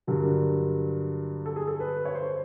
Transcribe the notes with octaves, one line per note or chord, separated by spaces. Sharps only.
G2 D3 F#3 A#4
A4
G#4
A4
B4
C#5
C5